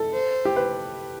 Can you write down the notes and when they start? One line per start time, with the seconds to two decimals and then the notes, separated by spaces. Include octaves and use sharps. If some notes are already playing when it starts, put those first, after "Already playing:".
Already playing: A4
0.13 C5
0.45 G4
0.56 B4